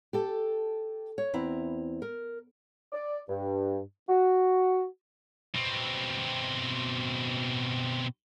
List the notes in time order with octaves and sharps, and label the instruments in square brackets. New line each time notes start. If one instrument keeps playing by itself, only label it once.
[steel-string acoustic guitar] G4 A4 G5
C#5
E2 C4 E4 A#5
A#4
[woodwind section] D5
G2
F#4
[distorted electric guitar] B2 C4